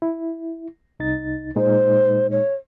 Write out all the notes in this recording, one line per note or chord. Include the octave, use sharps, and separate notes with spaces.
E4
C2 D#4 A6
A#2 G#3 D#4 C5
C#5